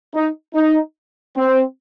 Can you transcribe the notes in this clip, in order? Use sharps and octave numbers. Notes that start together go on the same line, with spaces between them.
D#4
D#4
C4